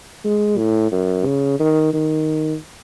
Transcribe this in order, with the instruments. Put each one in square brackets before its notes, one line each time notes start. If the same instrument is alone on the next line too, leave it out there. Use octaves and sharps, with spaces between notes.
[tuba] G#3
A2
F#2
C#3
D#3
D#3